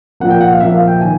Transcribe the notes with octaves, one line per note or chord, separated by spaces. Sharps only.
A#2 F3 A#3 F#5
G5
F#5
F5
A#2 F3 A#3 E5
F5
G5
D#3 G#5